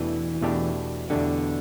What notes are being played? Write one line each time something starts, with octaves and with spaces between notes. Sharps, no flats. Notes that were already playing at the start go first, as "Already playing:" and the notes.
Already playing: E2 B2 E3 A3 D4 G4
E2 B2 A3 D4 G4
E2 B2 D3 A3 D4 G4